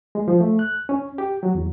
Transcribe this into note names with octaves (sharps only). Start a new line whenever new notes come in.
G#3
F3
A3
F#6
C#4
G4
F#3
E2